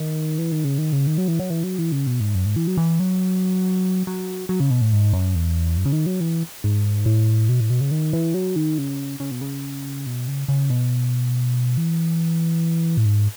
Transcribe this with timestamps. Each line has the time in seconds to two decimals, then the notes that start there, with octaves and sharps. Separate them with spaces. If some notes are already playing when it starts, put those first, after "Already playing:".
Already playing: D#3
0.38 E3
0.52 D#3
0.64 C#3
0.78 D#3
0.93 C#3
1.07 D#3
1.18 F#3
1.28 E3
1.39 F#3
1.50 E3
1.63 F#3
1.79 E3
1.92 C#3
2.07 B2
2.20 G#2
2.35 F#2
2.46 G#2
2.56 E3
2.67 F#3
2.77 E3
3.00 F#3
4.07 F#3
4.49 F#3
4.60 C#3
4.70 B2
4.81 A2
4.93 G#2
5.13 F#2
5.35 E2
5.77 F#2
5.85 C#3
5.93 D#3
6.06 F#3
6.20 E3
6.64 G#2
7.06 A2
7.49 B2
7.60 A2
7.70 B2
7.81 C#3
7.91 D#3
8.13 E3
8.34 F#3
8.56 D#3
8.78 C#3
9.20 C#3
9.31 B2
9.41 C#3
10.06 B2
10.28 C#3
10.48 C#3
10.70 B2
11.77 E3
12.97 A2
13.05 G#2